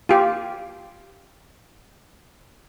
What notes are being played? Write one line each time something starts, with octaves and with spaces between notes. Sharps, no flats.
F4 G4